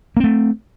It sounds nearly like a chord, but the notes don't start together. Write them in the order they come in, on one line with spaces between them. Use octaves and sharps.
A#3 C4 A3